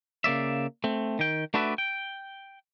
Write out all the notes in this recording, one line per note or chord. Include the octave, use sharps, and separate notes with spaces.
C#3 A#3 D5 E5
A3 C4
D#3 G5
A3 D4 F#4 B4 D5 E5
G5